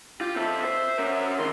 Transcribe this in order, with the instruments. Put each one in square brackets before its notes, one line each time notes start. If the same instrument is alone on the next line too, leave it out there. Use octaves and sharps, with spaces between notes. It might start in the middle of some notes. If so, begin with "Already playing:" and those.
[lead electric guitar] F4 [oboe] G4
[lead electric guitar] C4 A4 [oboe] E5
[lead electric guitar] C5
C#4 A#4
[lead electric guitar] D#3 C4 [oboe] C6